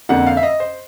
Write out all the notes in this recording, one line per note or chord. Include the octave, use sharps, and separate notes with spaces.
F2 D3 F3 A#3 F#5
F5
E5
D#5
C5